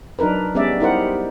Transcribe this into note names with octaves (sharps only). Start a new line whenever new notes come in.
F#3 D4 D#4 A#4 B4
G3 G#3 B3 C#4 D5 E5
D#4 E4 G4 A#4 C5 F#5